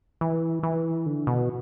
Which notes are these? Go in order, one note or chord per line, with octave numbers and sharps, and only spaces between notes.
E3
E3
D3
B2